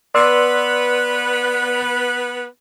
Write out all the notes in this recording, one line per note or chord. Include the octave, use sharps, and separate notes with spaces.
B3 B4 D5 C6 E6